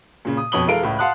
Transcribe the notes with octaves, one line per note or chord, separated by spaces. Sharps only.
A#2 C#3
D#6
F2 B2 C#5 D#6 F#7 G7
E3 G#3 A4 A#4 F5 D7
C#2 A2
F5 F#5 A5 C6 D#6 F#6